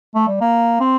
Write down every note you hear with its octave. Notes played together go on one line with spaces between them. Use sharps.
A3
G3
A#3
C4